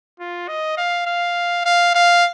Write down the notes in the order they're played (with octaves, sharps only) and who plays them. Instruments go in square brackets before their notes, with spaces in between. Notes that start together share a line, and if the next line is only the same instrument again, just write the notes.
[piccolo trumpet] F4
D#5
F5
F5
F5
F5